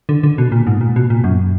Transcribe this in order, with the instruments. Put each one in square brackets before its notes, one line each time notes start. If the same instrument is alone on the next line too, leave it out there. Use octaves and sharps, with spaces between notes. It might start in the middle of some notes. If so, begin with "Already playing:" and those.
[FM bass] D3
D3
B2
A#2
G#2
A#2
B2
A#2
F#2